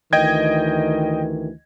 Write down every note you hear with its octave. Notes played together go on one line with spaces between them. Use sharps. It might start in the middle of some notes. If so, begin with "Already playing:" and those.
D2 D#3 E3 D#5 G5 G#6